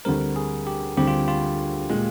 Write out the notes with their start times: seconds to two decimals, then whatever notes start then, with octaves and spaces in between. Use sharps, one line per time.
0.05 D2 D3 G3 C4 A#4
0.36 G#4
0.67 G4
0.97 D2 D3 G3 C4 G4
1.07 F4
1.28 F4
1.89 A#2 G#3